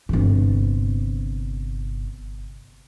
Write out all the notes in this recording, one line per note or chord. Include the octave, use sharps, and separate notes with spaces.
G1 C3